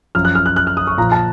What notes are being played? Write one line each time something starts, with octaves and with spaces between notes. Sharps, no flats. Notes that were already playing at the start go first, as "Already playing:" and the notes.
F#2 F3 F6
F#6
F6
F#6
F#6
F6
D#6
C#6
A#2 F3 A#5
A5